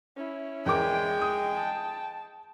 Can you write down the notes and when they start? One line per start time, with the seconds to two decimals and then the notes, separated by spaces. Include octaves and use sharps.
0.17 C#4 E4
0.66 E2 G#3 A#4 G5 D6
1.22 D#6
1.55 A5